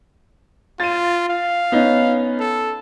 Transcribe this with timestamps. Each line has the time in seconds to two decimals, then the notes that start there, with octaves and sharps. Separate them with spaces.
0.80 F4 A6 D#7
1.28 F5
1.72 B3 C#4 D#4
2.39 A4